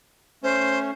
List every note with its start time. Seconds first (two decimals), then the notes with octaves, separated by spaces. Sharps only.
0.43 A3 C#4 C5